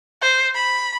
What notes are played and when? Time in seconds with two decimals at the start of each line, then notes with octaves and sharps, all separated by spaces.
0.22 C5
0.55 B5